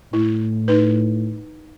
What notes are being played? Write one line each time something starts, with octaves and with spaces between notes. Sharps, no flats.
A2 E4
D#4 B4